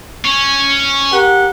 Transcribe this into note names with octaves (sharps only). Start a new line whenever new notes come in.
C#4
G4 A#4 F#5